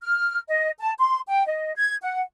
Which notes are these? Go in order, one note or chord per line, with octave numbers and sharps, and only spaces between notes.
F6
D#5
A5
C6
G5
D#5
G#6
F#5